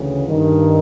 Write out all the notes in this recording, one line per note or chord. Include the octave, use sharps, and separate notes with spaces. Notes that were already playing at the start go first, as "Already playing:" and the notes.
Already playing: D2 C#3 E3
G2 D#3